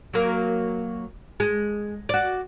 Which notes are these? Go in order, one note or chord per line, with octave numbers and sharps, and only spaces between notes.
F#3 A#3
G#3
F#4 D5